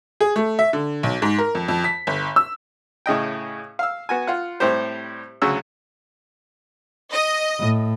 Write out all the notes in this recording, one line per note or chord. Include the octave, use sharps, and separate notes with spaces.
G#4
A3
E5
D3
B1
G#2
A#4
F2
F2
B6
G1
E6
A2 C#3 D#5 G5
F5 E6
B3 F#4 G#5
F4 F#5
A2 G3 C4 G4 C5
D2 C#3 F#3 E6
D#5
A2